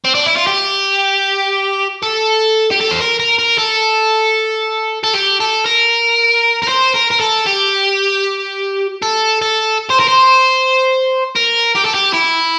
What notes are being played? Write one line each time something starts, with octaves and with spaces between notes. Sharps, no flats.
C4
D4
E4
F4
G4
A4
G4
A4
C5
A#4
A#4
A#4
A4
A4
G4
A4
A#4
A#4
C5
A#4
A#4
A4
G4
A4
A4
C5
A#4
C5
A#4
G4
A4
G4
E4